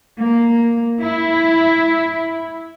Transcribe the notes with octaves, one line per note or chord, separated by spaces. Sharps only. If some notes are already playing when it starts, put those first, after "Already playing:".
A#3
E4